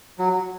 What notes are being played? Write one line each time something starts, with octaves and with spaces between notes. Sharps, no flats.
F#3